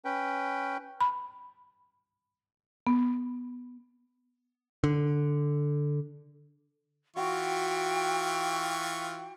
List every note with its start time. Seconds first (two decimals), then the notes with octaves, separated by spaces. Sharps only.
0.05 C#4 B4 G5
1.01 B5
2.87 B3
4.84 D3
7.16 E3 F4 F#4 G5 C#6